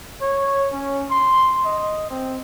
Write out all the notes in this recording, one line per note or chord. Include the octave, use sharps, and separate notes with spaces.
C#5
C#4
C6
D#5
C4